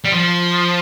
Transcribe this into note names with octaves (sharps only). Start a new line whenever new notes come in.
G3
F3